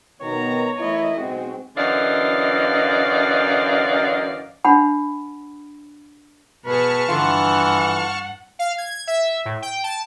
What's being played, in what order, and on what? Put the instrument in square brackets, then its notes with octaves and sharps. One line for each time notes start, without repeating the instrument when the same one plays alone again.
[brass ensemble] B2 D#3 [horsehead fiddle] B3 A#5 [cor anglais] C#5
[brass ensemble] E3 A#3 E4 [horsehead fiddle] A3 D#5
[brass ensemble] B1 A2 G#3 [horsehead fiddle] C4 [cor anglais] F#4
[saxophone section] F#2 D3 E3 D5 D#5 F5
[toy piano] D4 F#5 B5
[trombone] B2 [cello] G#4 B4 [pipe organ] A5 C#6 F6
[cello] G2 F#5 [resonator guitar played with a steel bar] D3 F3 F4 [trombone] E3
[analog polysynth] F5
G#6
E5
A2
G5
A5